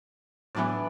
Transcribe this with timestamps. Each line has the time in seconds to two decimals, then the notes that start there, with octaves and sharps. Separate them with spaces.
0.55 A2 E3 F#3 B3 D4 D5